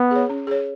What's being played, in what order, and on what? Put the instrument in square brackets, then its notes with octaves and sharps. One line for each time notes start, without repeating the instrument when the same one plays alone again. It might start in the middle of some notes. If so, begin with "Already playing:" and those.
Already playing: [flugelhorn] B3
[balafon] G#4 C#5
C#4
G#4 C#5